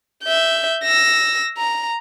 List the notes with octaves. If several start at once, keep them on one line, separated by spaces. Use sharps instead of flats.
E5 G6
E6 A#6
A#5